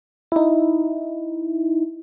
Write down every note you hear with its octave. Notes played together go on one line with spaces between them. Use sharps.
D#4 E4